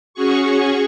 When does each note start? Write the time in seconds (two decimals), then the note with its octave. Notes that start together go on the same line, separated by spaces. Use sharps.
0.14 C#4 F#4 G#4 C#6